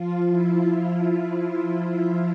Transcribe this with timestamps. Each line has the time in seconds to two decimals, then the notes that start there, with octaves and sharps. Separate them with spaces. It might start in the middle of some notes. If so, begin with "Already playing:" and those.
Already playing: F3 F4
0.29 E4
0.68 F3 F4